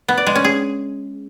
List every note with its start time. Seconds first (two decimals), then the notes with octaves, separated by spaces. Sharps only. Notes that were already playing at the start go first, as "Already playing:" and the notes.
0.09 B3
0.17 D5
0.26 G#3
0.35 C#4
0.44 G#4